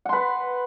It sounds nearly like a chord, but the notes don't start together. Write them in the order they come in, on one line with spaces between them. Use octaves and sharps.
F#5 C6 B4